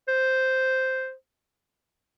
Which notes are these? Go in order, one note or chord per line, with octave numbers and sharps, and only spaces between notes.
C5